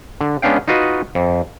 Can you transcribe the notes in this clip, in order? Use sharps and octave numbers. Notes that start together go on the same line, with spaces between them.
D3
G#3 B3 C#4 D4 F5 G5
D#4 F4 F#4 B4 D#5
F2